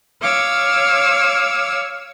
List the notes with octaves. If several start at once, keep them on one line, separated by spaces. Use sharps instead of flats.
C#5 F5 D6 E6